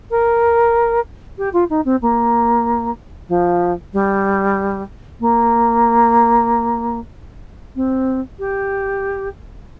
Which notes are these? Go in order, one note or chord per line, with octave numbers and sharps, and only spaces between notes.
A#4
G4
F4
D#4
C4
A#3
F3
G3
A#3
C4
G4